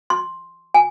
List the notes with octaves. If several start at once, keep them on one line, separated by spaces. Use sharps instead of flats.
C6
G#5